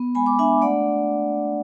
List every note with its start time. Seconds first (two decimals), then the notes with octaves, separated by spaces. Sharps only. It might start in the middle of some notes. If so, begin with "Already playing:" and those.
Already playing: B3
0.15 G#3 G#5 B5
0.26 B5 D6
0.39 D4 E5 G#5
0.61 A3 D5 F#5